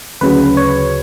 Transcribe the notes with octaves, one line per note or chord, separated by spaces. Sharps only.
D2 C#3 F#3 B4
C#5